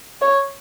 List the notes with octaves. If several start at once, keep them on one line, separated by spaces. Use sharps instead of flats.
C#5